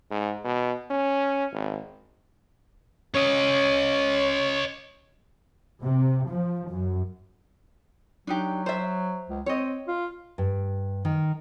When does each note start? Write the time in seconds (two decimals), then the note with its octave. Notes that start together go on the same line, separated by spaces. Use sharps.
0.11 G#2
0.45 B2
0.91 C#4
1.53 G#1
3.15 C#4 C#5 D#5
5.83 C3
6.30 F3
6.70 F#2
8.27 F#3 D4 D#4 G4
8.66 C5 E5
9.30 C#2
9.46 C4 C#5 D#5
9.87 F4
10.38 G2
11.05 D#3